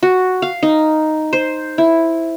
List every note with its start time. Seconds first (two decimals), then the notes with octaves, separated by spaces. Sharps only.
0.03 F#4
0.42 F5
0.63 D#4
1.33 C5
1.78 E4